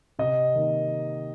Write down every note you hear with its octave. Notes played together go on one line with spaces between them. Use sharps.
C3 D#5
D#3 A#3